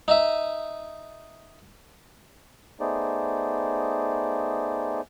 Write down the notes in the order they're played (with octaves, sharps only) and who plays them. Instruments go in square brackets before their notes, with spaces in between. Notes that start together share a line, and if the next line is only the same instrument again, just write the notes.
[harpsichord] D#4 D#5 E5
[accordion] A3 B3 D#4 G#4 C5 D5